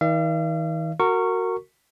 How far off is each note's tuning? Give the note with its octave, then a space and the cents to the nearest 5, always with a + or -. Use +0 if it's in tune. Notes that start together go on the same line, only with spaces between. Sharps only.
D#3 +45 D5 +30 F5 -45
F#4 +0 A#4 -25 C#6 -5